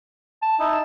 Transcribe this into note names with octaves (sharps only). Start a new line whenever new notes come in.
A5
D#4 E4